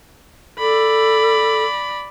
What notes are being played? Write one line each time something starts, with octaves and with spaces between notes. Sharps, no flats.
A4 D5 B5